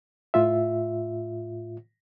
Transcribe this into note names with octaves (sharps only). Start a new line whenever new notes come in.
A2 F4 E5